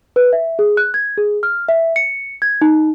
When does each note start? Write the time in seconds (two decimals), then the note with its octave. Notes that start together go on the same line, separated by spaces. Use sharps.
0.16 B4
0.33 E5
0.59 G#4
0.77 F#6
0.94 G#6
1.18 G#4
1.43 F6
1.69 E5
1.96 C#7
2.42 G#6
2.62 D#4